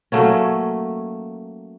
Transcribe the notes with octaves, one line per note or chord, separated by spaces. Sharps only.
F#3 A3 A#3 C#4